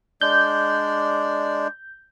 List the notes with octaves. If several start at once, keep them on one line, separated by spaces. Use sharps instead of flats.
G#3 D4 D5 G6